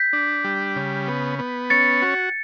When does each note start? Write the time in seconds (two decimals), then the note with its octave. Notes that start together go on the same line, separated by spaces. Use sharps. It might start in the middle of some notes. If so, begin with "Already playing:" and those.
Already playing: G6 B6
0.13 D4
0.44 G3
0.76 C#3
1.07 B3
1.39 B3
1.70 C#4 A6 C#7
2.02 F#4